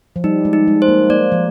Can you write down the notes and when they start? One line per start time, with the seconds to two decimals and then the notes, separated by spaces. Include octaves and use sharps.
0.16 F3
0.24 G3 D#4
0.45 G#3
0.53 D#4
0.68 G#3
0.82 C5
0.88 A#3
1.10 A#3 D5
1.32 F3